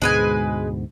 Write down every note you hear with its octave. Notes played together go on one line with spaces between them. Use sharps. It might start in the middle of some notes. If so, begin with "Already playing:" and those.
D2 G#2 B2 G#3 B4 G#5